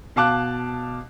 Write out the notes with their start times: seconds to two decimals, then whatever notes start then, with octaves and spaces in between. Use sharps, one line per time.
0.16 B2 F5 A5 D6 F#6